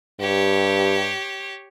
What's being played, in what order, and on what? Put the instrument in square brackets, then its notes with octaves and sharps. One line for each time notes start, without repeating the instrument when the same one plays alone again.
[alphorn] G2 [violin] G4 C#5